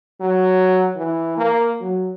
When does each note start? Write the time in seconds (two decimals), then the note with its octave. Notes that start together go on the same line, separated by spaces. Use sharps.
0.20 F#3
0.96 E3
1.37 A#3
1.80 F#3